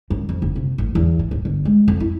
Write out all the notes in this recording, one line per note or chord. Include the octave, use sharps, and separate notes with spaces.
F#2
F2
F#1
C3
A1
E2
E3
D1
G1
G#3
F2
E4